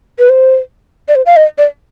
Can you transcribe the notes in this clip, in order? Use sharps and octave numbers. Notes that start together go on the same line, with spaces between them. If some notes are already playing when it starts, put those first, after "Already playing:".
B4
C5
D5
C5
F5
D#5
D5